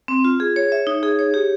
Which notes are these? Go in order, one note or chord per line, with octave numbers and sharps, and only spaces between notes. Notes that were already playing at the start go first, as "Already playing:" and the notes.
C4
F4
G#4
C#5
E5
D#4
G#4
C#5
G4